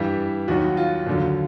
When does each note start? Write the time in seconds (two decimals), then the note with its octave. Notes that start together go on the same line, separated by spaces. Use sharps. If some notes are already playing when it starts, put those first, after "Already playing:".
Already playing: G2 E3 G3
0.48 D#2 D#3 F#3 F#4
0.77 F4
1.07 D#2 D3 F#3